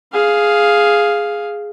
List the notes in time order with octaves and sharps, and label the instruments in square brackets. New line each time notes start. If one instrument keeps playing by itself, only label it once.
[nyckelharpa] G#4 F5